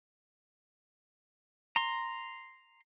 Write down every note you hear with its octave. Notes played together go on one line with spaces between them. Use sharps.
A#5 C6